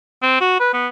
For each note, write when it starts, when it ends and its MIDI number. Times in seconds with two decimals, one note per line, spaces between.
0.23 0.39 60
0.41 0.58 66
0.60 0.71 71
0.73 0.87 59